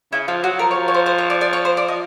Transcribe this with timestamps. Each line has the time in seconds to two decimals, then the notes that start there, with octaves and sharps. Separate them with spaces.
0.12 C#3 E4
0.28 F3 F4
0.43 F#3 F#4
0.59 F3 A#4
0.71 C#5
0.88 C#5
0.94 C5
1.06 C5
1.18 C#5
1.30 D5
1.41 D5
1.53 C#5
1.65 C5
1.77 D5
1.88 F3 D#5